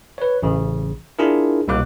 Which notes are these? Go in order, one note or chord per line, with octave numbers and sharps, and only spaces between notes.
B4 C#5
A1 C#3
D4 E4 F4 G#4 A#4
C2 B2 A#3 D6 F#6